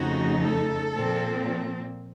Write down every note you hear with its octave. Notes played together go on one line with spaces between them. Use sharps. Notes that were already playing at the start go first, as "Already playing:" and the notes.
Already playing: F2 C#3 A3 D#4 F#4
A4
A#2 F3 C4